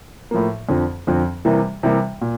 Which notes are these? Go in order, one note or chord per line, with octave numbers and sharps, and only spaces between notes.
A2 F3 A#3
F2 D3 F3 C4
F2 D3 F3 C4
C3 E3 G3 A#3
C3 E3 G3 A#3
A#2